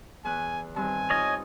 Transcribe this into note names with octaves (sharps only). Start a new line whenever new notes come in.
E2 B3 G#5 F#6
G2 D#3 C4 G#5
D#4 F4 C#5 D#5 D#6